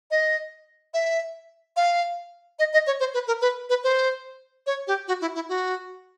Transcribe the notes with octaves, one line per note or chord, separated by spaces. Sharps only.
D#5
E5
F5
D#5
D#5
C#5
C5
B4
A#4
B4
B4
C5
C#5
G4
F#4
E4
E4
F#4